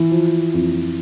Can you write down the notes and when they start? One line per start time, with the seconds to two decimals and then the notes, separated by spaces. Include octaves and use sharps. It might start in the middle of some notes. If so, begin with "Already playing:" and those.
Already playing: E3
0.10 F3
0.53 F2